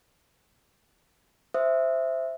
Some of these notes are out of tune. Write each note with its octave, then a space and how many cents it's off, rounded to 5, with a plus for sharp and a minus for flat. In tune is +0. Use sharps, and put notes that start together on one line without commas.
C5 +0 E5 +0 D#6 +0